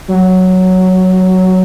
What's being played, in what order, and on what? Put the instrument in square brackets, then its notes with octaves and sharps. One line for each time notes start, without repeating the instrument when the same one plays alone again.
[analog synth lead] F#3